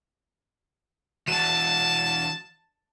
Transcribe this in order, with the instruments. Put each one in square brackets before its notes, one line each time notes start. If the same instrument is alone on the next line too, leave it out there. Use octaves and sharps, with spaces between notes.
[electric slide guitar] E3 F#4 [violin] A5 E7